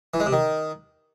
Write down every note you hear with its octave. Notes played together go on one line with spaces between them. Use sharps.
E3
G#3
C3
D#3